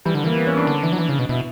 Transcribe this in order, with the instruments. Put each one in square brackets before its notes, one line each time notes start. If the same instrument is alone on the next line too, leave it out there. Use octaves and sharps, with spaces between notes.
[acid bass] E3 [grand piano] G3
[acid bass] D3
[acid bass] E3 [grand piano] A#3
[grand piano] B3
C#4
D4
[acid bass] D3
E3
F#3
E3
C#3
B2
[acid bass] B2 [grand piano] E4